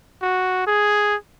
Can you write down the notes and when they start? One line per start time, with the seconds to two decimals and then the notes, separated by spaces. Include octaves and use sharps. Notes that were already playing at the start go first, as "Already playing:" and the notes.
0.22 F#4
0.67 G#4